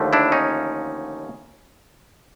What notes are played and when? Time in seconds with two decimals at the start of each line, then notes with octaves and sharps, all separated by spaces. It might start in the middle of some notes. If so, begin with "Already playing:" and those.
Already playing: D#2 D3 F3 A3
0.13 D4 E4
0.32 C#4 D#4